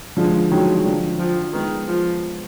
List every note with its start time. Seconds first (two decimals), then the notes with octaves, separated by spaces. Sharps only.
0.17 D3 F3 G#3
0.51 D#3 F#3 G#3
0.85 D3 F3
1.19 F3
1.53 D#3 G#3 B3
1.88 F3